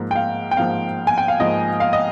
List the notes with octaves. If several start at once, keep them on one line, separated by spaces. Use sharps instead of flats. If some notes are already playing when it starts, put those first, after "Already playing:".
Already playing: G#2 F3 A#3
G5
F5
G5
G#2 F3 A#3 F5
G#5
G5
F5
G#2 F3 A#3 D#5
F5
D#5